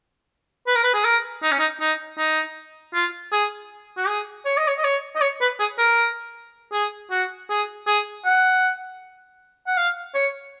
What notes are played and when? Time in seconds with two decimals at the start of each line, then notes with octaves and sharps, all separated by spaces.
0.67 B4
0.75 A#4
0.84 B4
0.94 G#4
1.05 A#4
1.43 D#4
1.51 C#4
1.59 D#4
1.80 D#4
2.18 D#4
2.94 F4
3.32 G#4
3.97 F#4
4.08 G#4
4.45 C#5
4.57 D#5
4.68 C#5
4.78 D#5
4.84 C#5
5.16 D#5
5.21 C#5
5.41 B4
5.60 G#4
5.78 A#4
6.73 G#4
7.11 F#4
7.50 G#4
7.87 G#4
8.25 F#5
9.67 F#5
9.77 F5
10.15 C#5